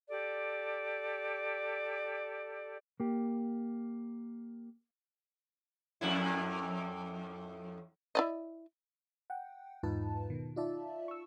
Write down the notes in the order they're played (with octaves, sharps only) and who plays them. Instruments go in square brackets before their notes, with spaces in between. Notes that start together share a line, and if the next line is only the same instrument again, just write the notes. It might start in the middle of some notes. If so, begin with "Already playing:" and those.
[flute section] G4 A4 D5
[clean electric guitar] A#3 G4
[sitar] F2 A2 E4
[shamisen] E4 D5 D#5
[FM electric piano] F#5 G5
E2 G#2 D#4 F4 B4 A5
B2 D#3
D#4 F4 D5 E5 A5
C#6 E6